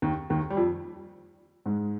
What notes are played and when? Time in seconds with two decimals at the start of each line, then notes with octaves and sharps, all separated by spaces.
0.02 D#2 D#3
0.30 D#2 D#3
0.50 G3
0.57 F2 F3
1.66 G#2 G#3